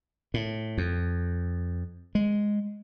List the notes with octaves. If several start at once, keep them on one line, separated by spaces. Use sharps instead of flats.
A2
F2
G#3